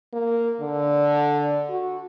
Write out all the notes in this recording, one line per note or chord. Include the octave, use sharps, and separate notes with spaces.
A#3
D3
F#4